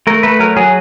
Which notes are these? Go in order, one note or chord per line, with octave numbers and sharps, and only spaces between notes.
A3 A#4
A3 B4
F#3 A#4
F#3 G#4